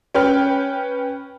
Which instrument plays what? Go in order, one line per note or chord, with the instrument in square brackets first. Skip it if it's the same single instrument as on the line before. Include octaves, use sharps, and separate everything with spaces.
[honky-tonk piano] C#4 B4 G5 F6